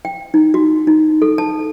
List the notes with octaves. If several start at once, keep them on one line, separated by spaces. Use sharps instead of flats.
G5
D#4
F#4
D#4
A4
A5